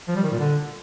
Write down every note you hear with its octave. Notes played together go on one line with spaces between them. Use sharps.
F3
G3
D#3
A#2
D3